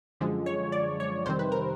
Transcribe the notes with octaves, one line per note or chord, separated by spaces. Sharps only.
F#2 D3 F3 G#3
C#5
D5
C#5
F2 C3 D#3 G3 C4 C5
B4
A#4